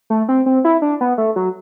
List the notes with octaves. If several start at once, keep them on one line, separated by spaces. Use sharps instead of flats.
A3
C4
C4
E4
D4
B3
A3
F#3